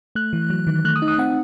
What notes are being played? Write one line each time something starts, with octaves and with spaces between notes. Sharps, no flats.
A3 F#6
E3
F#3
D#3
A3 F#6
D#6
D#4
D#6
C4 F#5